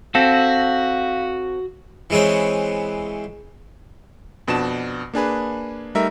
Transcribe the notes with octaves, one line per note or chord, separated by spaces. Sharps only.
C4 F#4 A4 F5 A#6 B6
E3 G#3 B3 C4 C#5
F2 B2 D4 A5 E7
A#3 D4 G#4 B4
G3 A3 D#4 A#4 E5